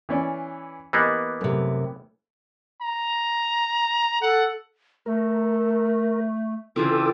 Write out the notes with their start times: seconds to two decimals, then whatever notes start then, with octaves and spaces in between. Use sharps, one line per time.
0.09 E3 C#4 D5
0.93 E3 A#3 B3 G4 D#5 F#6
1.41 F#2 C3 A3
2.82 A#5
4.22 A4 F#5
5.06 A3 A#4
6.76 C#3 E3 C4 F4 A4 D6 E6